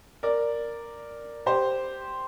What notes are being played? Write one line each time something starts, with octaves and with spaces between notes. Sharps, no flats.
A#4 D5
G4 C5